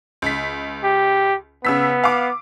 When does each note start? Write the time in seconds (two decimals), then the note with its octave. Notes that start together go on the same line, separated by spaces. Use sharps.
0.22 C#2 B6
0.84 G4
1.65 C#3 B3 E6 B6
2.04 F5 D6